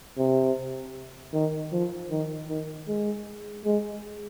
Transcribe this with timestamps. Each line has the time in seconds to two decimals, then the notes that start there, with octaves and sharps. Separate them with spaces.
0.18 C3
1.34 D#3
1.72 F3
2.11 D#3
2.49 D#3
2.88 G#3
3.65 G#3